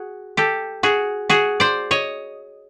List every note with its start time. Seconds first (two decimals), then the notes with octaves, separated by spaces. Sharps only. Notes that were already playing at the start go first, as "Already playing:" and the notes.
Already playing: F#4 G#4
0.37 G4 A4
0.83 F#4 G#4
1.29 F#4 G#4
1.60 C5 D5
1.91 C#5 D#5